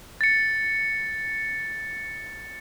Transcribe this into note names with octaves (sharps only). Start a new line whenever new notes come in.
A6 C#7